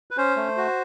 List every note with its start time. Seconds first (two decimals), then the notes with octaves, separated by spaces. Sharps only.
0.11 B4
0.17 C#4 C5
0.36 A3
0.57 F#4